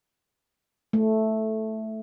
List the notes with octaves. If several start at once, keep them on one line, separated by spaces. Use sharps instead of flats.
A3